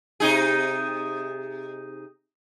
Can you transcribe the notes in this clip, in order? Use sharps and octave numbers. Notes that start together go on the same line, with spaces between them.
C3 D#4 G#4